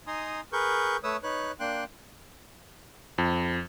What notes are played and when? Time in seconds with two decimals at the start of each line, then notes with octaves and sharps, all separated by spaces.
0.07 D#4 G#5 A#5 C6 D#6
0.53 G#4 A#4 B4 C#6 G6
1.04 A3 B4 C#5 D#6 E6
1.23 D#4 B4 C#5 F#6
1.60 A#3 D4 G5 C6 F#6
3.18 F2